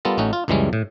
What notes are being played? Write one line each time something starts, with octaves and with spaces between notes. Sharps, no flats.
G3 B3 F4 A4 A#4
A1 A3 C#4 D#4 F#4
F4
C#2 F#2 E3 G3 G#3 C#4
A2